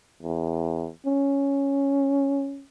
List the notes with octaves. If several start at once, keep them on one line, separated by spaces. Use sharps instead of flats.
E2
C#4